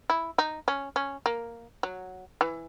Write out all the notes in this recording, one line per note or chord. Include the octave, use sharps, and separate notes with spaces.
E4
D#4
C#4
C#4
A#3
F#3
E3